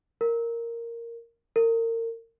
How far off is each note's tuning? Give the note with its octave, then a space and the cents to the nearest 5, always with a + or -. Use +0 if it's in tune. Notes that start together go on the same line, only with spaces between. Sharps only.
A#4 -5
A#4 -35